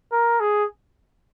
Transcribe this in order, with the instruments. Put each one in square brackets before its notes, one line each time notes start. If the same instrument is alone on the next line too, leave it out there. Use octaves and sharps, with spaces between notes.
[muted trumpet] A#4
G#4